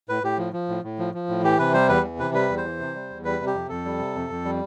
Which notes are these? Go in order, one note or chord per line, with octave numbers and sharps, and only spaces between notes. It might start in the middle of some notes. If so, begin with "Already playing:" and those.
A2 B4
A2 G4
F3
F3
A2
A2
F3
F3
A2
E3 G4
C3 B4
G3 C5
E2 B4
E3
C3 B4
G3 B4
E2
C5
E3
C3
G3
E2
G3 B4
C3
G4
F2
F2 A4
G3
C3
F2
F2
G3